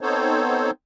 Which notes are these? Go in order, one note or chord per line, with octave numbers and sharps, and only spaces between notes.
B3 C4 D#4 A4 C5 C#5